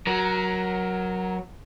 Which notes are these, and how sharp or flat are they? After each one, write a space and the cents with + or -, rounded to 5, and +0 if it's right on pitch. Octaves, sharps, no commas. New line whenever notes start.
F#3 +0 A#4 +15